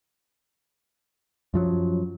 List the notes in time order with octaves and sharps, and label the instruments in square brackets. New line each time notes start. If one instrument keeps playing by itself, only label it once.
[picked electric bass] F#2 F3 F#3